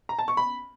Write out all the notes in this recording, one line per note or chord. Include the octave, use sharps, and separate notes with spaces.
A#5
A5
C#6
B5